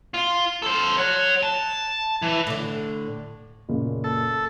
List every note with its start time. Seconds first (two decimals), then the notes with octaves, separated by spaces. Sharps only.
0.14 F4
0.62 A4 C5
0.97 C#5 F#5
1.43 A5
2.22 E3
2.47 A2 D3
3.69 F#1 A#2 C#3
4.04 A4